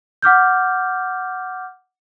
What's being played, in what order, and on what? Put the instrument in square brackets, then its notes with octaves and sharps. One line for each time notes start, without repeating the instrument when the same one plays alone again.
[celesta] F#5 D6 F6 G6